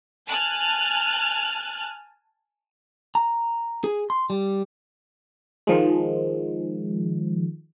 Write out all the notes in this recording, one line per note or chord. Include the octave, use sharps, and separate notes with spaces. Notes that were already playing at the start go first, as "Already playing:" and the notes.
G#5 A5 F6 F#6
A#5
G#4
C6
G3
D#3 F3 G#3